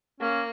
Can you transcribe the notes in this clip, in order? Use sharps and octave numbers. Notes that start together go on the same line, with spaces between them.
A#3 C#4